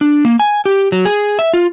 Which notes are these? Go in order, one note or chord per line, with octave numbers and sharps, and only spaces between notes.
D4
A#3
G#5
G4
F#3
G#4
E5
F4